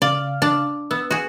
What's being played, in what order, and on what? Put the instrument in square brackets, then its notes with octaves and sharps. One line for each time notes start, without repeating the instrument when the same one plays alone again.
[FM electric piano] C#3 F5 F6 [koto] D5
[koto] D4 D5
[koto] B3 [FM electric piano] E6
[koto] F#4 G#4 [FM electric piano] F#6